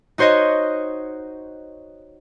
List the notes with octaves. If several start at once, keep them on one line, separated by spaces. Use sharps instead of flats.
D#4 F#4 C5 C#5 D#5